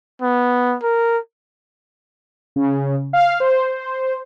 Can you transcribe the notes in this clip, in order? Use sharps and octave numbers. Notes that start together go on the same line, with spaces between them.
B3
A#4
C#3
F5
C5